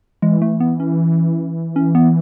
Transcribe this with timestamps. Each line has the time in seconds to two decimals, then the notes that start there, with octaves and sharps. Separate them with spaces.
0.22 E3 G#3
0.42 A3
0.60 B3
0.80 C#4
1.76 C#4
1.95 B3